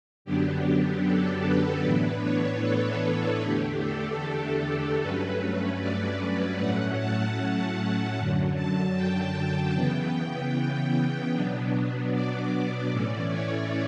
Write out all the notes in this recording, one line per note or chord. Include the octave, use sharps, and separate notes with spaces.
F#2 D3 F#3 B3 D4 G4
G4
A4
B4
A2 E3 B3 D4
C#5
A4
E2 D3 A3 D4 G4
A4
A4
G2 F#3 A3 C#4 B4
D5
A2 F#3 A3 C#4 F#5
A5
F#2 D3 F#3
A5
G5
G5
C#3 E3 B3
G5
B2 F#3 B3 D4
D5
A2 E3 A3 C#4 D5
C#5